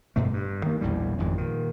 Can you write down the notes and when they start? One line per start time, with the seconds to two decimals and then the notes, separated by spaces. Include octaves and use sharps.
0.16 G2 B2 A3
0.33 G2
0.63 D#3 A#3
0.81 A#1 E2 A2 G3
1.18 G#1 F2 G#2
1.38 A#2 D#3